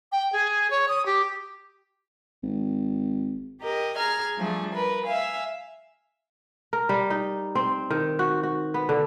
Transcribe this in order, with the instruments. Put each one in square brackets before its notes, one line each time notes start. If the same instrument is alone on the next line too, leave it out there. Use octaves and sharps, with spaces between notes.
[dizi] G5
G#4
C#5
D#6
G4
[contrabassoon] G#1
[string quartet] G4 A#4 D#5
G#4 A#5 F6 G#6
F3 G3 A3 D4 G#4
A#4 B4 B5
E5 F5 G#5
[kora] A#4
G3
D#4
C4
D#3
F#4
F#4
B3
D3